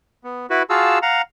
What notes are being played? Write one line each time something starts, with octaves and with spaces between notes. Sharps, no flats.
B3
E4 F#4 B4
F4 F#4 G#4 F5 A5 E6
F5 F#5 A#5